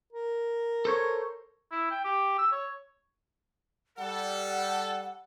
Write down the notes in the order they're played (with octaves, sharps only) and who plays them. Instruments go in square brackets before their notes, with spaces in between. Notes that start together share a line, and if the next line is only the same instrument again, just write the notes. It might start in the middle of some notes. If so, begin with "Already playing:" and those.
[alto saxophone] A#4
[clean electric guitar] A4 C5 C#5
[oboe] E4
G5
G4
E6
C#5
[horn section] G3 A4 [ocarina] F#5